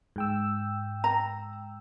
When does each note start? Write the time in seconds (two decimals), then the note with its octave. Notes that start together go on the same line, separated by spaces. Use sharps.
0.16 G#2 G5 E6
1.04 A#5